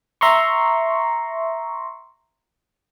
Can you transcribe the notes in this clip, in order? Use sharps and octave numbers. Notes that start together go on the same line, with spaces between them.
E5 A#5 C6 C#6